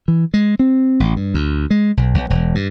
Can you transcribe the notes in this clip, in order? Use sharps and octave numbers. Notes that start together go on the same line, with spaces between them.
E3
G#3
C4
A1
G2
D2
G#3
B1
B1
E1
G2